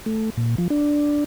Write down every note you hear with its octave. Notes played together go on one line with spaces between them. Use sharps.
A3
A#2
F3
D4